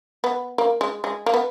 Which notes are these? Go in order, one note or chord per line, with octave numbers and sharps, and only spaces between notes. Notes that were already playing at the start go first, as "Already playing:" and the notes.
B3
A#3
G#3
G#3
A#3
B3